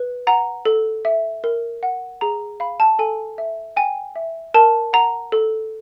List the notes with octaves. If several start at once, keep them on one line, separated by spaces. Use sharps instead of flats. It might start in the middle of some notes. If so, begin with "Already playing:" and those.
Already playing: B4
F#5 A#5
A4
E5
A#4
F#5
G#4 A#5
F5 B5
A5
A4 G#5
E5
G5 G#5
E5
A#4 A5
F#5 A#5
A4